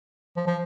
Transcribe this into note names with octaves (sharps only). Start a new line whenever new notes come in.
F3
F3